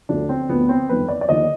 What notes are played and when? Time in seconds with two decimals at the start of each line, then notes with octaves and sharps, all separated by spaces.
0.09 D2 D3 F3 D4
0.29 C4
0.49 D2 D3 F3 B3
0.69 C4
0.89 G1 F2 D#3 B4
1.09 D5
1.21 D5
1.29 D#2 D3 F3 D#5